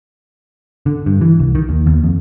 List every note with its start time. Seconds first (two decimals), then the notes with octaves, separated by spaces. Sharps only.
0.86 D3
1.06 G2
1.21 E3
1.39 C2
1.55 D#3
1.69 D#2
1.86 D#2
2.04 F2